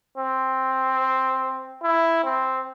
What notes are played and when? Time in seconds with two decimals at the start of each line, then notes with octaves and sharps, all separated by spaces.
0.17 C4
1.83 E4
2.24 C4